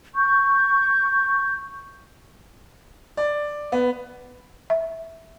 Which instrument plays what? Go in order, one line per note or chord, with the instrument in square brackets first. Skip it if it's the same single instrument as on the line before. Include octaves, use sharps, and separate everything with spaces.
[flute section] C#6 G6
[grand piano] D5
B3
[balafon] E5